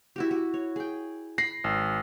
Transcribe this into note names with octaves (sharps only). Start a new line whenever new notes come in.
E4 F#4 G4
F#4
C#5
G#4 G5
B5 A#6 C7
G#1